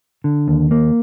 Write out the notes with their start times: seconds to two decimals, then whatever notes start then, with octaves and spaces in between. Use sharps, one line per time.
0.24 D3
0.48 D#2
0.71 A#3